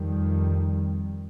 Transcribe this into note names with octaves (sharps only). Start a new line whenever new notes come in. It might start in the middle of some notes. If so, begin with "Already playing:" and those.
Already playing: F2 D#3 G3